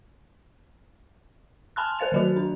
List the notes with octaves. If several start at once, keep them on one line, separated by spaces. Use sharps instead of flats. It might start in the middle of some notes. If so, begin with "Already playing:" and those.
G#5 A5 B5 C6 F6 F#6
A#4 C5 F5 A6 F7
D#3 F#3 F#4
D4